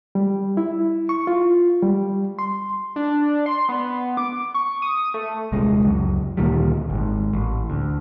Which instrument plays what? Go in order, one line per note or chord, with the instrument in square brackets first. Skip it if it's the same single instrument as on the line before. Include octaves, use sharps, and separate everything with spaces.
[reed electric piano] G3
E4
C#6
F4
G3
C6
[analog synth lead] D4
C6
B3
D6
C#6
D#6
A3
[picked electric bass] D#1 C2 G#3
C#2 F#2
D2 A#2 D#3 G3
G#1 G#2
A1
D2